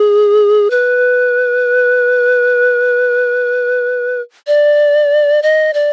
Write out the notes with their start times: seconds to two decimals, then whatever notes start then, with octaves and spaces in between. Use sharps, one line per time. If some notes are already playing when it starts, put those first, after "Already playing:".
Already playing: G#4
0.70 B4
4.47 D5
5.43 D#5
5.74 D5